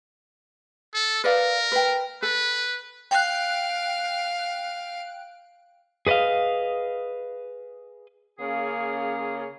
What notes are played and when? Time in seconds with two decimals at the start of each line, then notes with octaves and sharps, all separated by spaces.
0.94 A4
1.24 A#4 B4 D5 F5
1.72 B4 G5
2.22 A4 B4
3.11 F5 G5 F#6
6.07 G#4 B4 D5 D#5 F5
8.39 C#3 A#3 C#4 G#4 F5